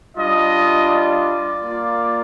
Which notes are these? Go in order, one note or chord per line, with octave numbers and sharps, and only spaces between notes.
G3 D4 F4 D#5
D5
A#3 F4